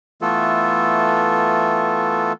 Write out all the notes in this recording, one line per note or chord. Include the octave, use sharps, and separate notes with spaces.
E3 A3 B3 F4 A4